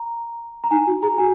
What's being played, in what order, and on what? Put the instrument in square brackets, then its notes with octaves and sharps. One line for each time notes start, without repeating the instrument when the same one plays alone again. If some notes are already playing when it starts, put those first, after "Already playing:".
Already playing: [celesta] A#5
A#5
[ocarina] D#4 [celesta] G#5
[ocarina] F#4
[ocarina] G#4 [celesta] A#5
[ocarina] F#4 [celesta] G#5